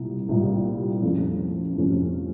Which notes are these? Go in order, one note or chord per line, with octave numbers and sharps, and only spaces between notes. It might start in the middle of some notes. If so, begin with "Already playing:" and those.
Already playing: C2 A#2 G3
C2 A#2 G3
F2 C3 F3 A3 C#4
F2 C3 F3 A3 C#4